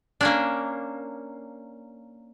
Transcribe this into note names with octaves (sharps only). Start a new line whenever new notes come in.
A#3 C#4 D4